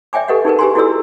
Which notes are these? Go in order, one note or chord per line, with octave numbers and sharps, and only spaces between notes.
D5 E5 G5 G#5 D6
G4 A4 B4 D#5 F#5
D#4 G#4 A#4 B4
G4 B4 G#5 A#5 C6
E4 F#4 G#4 A4 D5 E6